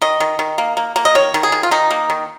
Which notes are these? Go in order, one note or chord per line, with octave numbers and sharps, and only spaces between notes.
D#3 D#5
D#3
D#3
A#3
A#3
A#3
D#5
D#3 C#5
D#3
G#4
D#3
F4
D#3 D#4
A#3
D#3